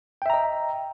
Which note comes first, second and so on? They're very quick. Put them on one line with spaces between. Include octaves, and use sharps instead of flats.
G5 E5 A#5 D#5